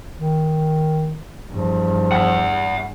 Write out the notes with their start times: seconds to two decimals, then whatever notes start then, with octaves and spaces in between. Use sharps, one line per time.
0.17 D#3
1.50 E2 G2 F3
2.12 E5 F#5